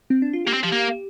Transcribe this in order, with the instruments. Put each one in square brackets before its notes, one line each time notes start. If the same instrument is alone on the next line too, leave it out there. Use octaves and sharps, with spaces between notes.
[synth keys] C4
D4
F4
[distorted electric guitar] A#3 [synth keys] G4
[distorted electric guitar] C4
F3
A#3